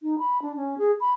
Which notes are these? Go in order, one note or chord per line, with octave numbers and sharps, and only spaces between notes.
D#4
B5
D4
C#4
G#4
B5